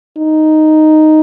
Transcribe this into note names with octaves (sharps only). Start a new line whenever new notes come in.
D#4